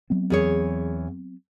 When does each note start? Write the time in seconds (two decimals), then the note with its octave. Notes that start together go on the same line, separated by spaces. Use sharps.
0.10 F#3 B3 C4
0.30 E2 G#4 C#5